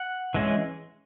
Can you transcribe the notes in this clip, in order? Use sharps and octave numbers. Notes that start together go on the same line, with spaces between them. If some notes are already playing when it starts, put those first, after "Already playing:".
Already playing: F#5
E3 G#3 C#4